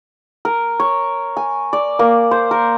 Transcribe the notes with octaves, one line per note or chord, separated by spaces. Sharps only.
A#4
C#5
G#5
D5
A#3
C5
A#4